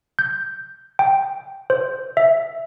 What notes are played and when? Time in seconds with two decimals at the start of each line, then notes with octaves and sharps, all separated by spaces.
0.19 G6
0.99 G5
1.70 C5
2.17 E5